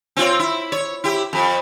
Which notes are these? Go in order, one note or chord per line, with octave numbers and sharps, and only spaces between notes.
C4 F4 C#5
E4
C#5
E4 G4
F2